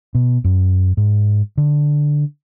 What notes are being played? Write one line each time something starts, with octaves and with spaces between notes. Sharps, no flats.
B2
F#2
G#2
D3